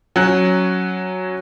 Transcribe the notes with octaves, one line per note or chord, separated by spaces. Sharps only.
F#3 C#4 F#6